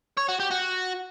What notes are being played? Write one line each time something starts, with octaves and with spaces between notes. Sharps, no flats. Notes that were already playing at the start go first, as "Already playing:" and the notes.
C#5
F#4
G4
F#4